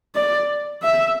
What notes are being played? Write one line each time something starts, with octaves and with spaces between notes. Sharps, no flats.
D5
E5